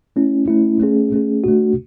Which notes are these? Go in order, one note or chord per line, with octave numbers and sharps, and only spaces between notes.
A3 C#4 E4
A3 C#4 E4
A3 C#4 G#4
A3 C#4 G#4
A3 D4 F#4